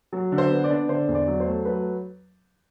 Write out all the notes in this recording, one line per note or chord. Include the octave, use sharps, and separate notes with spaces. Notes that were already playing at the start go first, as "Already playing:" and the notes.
F#3
D3
C5
B3
D5
D4
D3 C5
E2
D5
F#3
C5
A3
F#3 B4